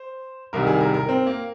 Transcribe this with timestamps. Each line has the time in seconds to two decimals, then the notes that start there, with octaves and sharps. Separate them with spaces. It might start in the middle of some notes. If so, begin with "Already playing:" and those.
Already playing: C5
0.53 C2 C3 D#3 A#4
0.67 G#4
0.81 A#4
0.94 A#4
1.09 C4
1.27 A#3